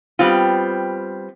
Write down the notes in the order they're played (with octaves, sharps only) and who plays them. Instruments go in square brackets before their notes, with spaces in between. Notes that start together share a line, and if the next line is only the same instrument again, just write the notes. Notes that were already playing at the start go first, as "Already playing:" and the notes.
[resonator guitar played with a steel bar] G3 B3 C4 F4